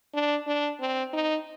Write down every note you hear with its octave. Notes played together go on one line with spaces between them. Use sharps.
D4
D4
C4
D#4